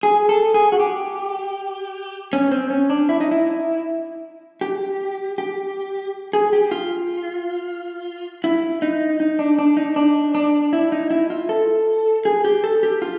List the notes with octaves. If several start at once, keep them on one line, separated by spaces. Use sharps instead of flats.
G#4
A4
G#4
F#4
G4
C#4
C4
C#4
D4
E4
D#4
E4
G4
G4
G#4
G4
F4
E4
D#4
D#4
D4
D4
D#4
D4
D4
E4
D#4
E4
F4
A4
G#4
G4
A4
G4
F4